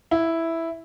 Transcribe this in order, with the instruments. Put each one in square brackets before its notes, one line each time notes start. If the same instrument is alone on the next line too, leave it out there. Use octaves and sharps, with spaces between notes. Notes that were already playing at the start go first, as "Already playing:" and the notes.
[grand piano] E4